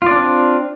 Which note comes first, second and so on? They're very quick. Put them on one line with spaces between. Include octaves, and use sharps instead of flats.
F4 D5 D4 C4